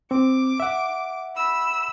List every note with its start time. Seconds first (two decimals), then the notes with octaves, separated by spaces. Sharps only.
0.11 C4 D6
0.60 E5 F#5
1.36 B5 E6